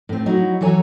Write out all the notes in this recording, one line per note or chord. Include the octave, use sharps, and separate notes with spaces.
A2 C4
F#3 D#4 E4 F#4
E3 F#3 A4 C#5 G#5 A#5